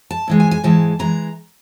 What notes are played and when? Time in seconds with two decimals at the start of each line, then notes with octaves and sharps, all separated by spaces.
0.11 A5
0.28 G#2 E3 G#3
0.40 G#5
0.51 G#5
0.63 G#2 E3 G#3 A5
0.99 E3 G#3 A#5